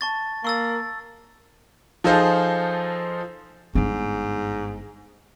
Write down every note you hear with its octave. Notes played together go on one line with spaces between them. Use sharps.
A5 C#6 A6
A#3 C#6 E6 A6
F3 D#4 F4 G#4 A4 C5
G1 G#2 D4